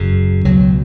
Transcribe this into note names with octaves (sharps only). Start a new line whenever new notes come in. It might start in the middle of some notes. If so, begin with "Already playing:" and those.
Already playing: F#1 F#2 C#3
C#2 B2 F#3